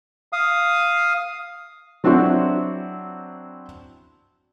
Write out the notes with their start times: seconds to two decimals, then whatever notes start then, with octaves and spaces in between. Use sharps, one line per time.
0.33 F5 D#6
2.04 F#3 C4 D4 E4 F#4